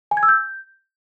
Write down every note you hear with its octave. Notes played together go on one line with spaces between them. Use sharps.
G#5
G#6
E6
G6